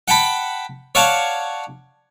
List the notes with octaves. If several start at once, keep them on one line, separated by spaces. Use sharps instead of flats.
F#5 G5 A5 B5
C#5 D5 F5 F#5 A5